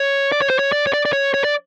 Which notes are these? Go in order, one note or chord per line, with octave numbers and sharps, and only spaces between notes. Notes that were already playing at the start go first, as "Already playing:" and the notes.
Already playing: C#5
D5
C#5
C5
C#5
D5
C#5
D5
D5
C#5
C#5
D5